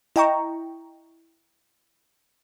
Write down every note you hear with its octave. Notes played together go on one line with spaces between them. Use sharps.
E4 D#5 G5 A#5 C#6